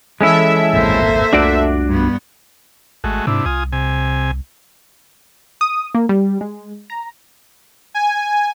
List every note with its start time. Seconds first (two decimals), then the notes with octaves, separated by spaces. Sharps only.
0.21 E3 G#3 C#4 E4 A4 E5
0.73 D1 G#1 A#3 C4 C5
1.33 C2 A3 D4 F#4 D5
1.88 G2 B3
3.04 G#1 G#3 A3 F#4
3.27 G#2 C3 D4 E4
3.46 C2 F4 G#5 D#6
3.72 C3 G#5
5.61 D#6
5.95 A#3
6.09 G3
6.41 G#3
6.90 A#5
7.94 G#5